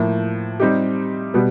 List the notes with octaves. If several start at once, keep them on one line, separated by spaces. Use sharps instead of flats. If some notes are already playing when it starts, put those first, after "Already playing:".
Already playing: A2 F3 A#3
G3 C4 D#4 G4
B2 G3 B3